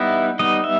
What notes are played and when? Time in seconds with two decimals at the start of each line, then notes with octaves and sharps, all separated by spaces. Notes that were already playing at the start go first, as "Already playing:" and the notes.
Already playing: G3 B3 D#4 E4
0.39 G3 B3 D#4 D#5
0.64 E5